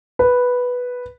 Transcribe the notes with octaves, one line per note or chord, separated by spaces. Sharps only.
B4